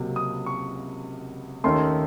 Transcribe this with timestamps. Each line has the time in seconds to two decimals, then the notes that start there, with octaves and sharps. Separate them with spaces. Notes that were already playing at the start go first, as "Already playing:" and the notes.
Already playing: C#2 C3 F#3 A#3
0.16 D#6
0.46 C#6
1.64 D#2 D#3 A3 C#4 C6